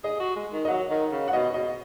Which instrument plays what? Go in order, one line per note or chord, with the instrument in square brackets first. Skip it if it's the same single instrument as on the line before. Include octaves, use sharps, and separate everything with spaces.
[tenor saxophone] G#4 [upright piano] D#5
[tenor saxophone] F#4
G#3
D#3
[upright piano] D#5
[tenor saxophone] F#3 [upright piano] F#5
[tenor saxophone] D#3
C#3
[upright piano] F#5
[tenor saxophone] B2 [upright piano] D#5
[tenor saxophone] B2 [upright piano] D#5